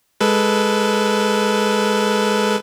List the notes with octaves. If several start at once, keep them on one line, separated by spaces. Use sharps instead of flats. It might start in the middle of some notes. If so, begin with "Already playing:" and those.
G#3 A4 B4